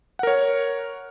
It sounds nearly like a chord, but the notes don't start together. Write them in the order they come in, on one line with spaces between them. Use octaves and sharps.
F#5 A#4 C#5